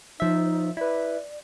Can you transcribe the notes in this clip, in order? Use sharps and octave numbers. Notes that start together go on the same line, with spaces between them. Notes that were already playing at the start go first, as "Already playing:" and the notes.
F3 D#4 E5
E4 B4 D5